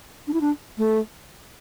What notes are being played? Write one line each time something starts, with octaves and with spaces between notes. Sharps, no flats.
D4
E4
D4
A3